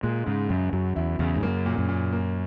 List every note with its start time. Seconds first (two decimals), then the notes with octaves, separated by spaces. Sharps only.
0.03 A#2 G#3
0.26 G#2 C#3
0.50 F#2 C#3
0.73 F#2 F#3
0.96 E2 E4
1.19 E2 C#3
1.36 G#2
1.42 F#2 A#3
1.66 A#2
1.78 F#2
1.89 A#2
2.13 A#3